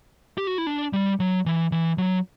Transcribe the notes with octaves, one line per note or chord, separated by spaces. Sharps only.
G4
F#4
E4
D4
G3
F#3
E3
E3
F#3